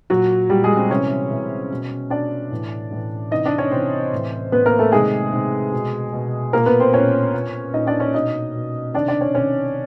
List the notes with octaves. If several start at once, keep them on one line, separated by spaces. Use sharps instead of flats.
A#2 F#3 F#4
A#2 G3 G4
G#3 G#4
C4 C5
C3 E3 C#4 C#5
C3 E3
B2
B2 D4 D5
A2 E3
A2 E3
C3 E3 D#4 D#5
D4 D5
C#4 C#5
C3 E3 C4 C5
A2 E3
A2 E3 B3 B4
A#3 A#4
A3 A4
C3 D#3 G#3 G#4
C3 D#3
B2
B2
A#2 A#3 A#4
B3 B4
C4 C5
A#2 C#4 C#5
A#2
A#2 D#4 D#5
D4 D5
C#4 C#5
B2 D#4 D#5
B2
C3 D#3 D4 D5
D4 D5
C#4 C#5
C3 D#3 C#4 C#5